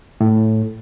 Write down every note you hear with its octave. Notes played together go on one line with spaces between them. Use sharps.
A2